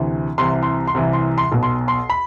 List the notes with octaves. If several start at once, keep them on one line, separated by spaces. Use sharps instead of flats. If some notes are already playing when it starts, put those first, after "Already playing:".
Already playing: D2 C3 E3
C2 C3 E3 C6
C6
C6
C2 C3 E3
C6
C6
B1 B2
C6
C6
B5